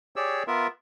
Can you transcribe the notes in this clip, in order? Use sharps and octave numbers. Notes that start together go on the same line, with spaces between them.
G4 G#4 C#5 D5 E6
B3 F4 A#4 E5